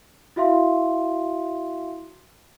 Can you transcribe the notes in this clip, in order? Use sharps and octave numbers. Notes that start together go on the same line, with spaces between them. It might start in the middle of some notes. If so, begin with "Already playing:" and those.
E4 F#4 E5 F5 C6